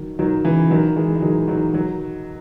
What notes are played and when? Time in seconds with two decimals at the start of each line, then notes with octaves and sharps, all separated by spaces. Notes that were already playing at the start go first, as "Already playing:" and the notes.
Already playing: D#3 F#3
0.19 D#3 F#3
0.45 C#3 E3
0.70 D#3 F#3
0.96 E3 G#3
1.15 G#3
1.22 D#3 F#3
1.48 D#3 F#3
1.74 D#3 F#3